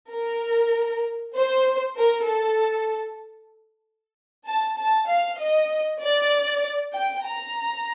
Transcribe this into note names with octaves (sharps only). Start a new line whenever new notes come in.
A#4
C5
A#4
A4
A5
A5
F5
D#5
D5
G5
A#5